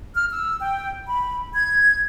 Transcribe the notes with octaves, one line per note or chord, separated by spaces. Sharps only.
F6
E6
G5
B5
G#6